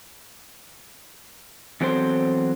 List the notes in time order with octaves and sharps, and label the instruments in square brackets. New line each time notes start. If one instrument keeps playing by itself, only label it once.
[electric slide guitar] E2 F#3 C4 A4 C5